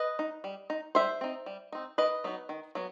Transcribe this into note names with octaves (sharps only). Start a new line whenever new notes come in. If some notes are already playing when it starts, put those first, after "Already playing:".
Already playing: B4 D#5
D#4
G3
D#4
G3 C5 E5
C4 D#4
G3
C4 D#4
D#3 B4 D#5
F#3 B3 D#4
D#3
F#3 B3